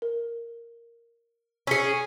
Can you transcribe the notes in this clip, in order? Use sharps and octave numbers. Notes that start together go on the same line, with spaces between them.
A#4
C#4 G#4 E6 B6 C#7